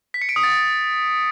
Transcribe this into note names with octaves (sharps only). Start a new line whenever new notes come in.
B6
C#7
D7
D#6
A6